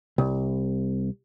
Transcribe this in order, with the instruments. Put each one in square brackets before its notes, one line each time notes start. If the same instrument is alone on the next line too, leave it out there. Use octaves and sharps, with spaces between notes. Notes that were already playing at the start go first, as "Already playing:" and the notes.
[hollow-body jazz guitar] C2